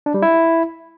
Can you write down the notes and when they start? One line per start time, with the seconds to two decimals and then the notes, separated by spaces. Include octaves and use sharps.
0.06 D4
0.14 G3
0.22 E4